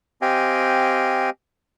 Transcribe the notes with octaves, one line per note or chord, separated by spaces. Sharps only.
C4 G4 D#5 F5 G5 G#5